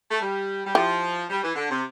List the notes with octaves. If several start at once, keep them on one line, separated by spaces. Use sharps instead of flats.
A3
G3
G3
F3 E4 G4
G3
E3
D3
C3